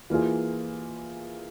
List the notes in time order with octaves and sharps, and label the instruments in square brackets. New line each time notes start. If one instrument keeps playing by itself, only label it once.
[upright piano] E3 A#3 F4 G#4